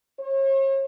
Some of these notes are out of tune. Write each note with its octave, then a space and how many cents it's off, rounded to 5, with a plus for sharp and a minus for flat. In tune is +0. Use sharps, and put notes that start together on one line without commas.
C#5 -40